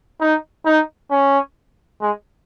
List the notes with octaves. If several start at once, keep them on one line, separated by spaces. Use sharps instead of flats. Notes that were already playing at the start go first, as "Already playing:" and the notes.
D#4
D#4
C#4
G#3